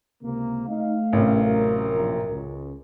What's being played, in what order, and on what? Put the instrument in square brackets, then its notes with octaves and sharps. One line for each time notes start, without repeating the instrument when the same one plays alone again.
[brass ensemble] C#2 C3 A#3
[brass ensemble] A3 F5 [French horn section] D#4
[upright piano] A1 C3 [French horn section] G2 C#4 A#4
[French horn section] F#2 A#4
[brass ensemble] A#1 A#2
C#2